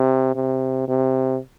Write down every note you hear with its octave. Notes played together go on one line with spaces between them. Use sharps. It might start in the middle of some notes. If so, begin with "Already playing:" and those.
Already playing: C3
C3
C3